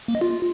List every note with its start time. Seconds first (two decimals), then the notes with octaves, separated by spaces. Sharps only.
0.08 A#3
0.15 D#5
0.21 F4